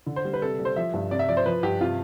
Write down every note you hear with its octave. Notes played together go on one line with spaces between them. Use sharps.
D3
C5
G3
B4
C3 A4
G3
C5
F3 E5
G2
C3 D5
E5
F3 D5
C5
F3 B4
G2 G4
C3 F4